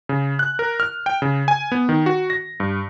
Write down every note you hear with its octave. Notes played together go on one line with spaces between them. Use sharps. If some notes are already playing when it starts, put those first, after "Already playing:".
C#3
F#6
A#4
F6
G5
C#3
G#5
B3
D#3
F#4
A#6
G2